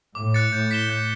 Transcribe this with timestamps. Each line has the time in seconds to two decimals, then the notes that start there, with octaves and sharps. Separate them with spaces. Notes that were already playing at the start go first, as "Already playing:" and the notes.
0.15 A2 D6
0.34 F#6 A6 C#7
0.52 A2 G6
0.71 B6 E7 G7
0.90 G6